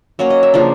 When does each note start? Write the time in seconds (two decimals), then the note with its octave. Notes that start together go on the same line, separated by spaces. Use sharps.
0.19 F#3 A#3 C#4 C#5
0.30 D#5
0.43 E5
0.54 C#3 F3 A#3 D4